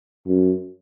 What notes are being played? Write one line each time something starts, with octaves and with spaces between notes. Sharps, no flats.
F#2